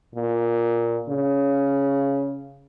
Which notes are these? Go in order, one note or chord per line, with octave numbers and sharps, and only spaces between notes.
A#2
C#3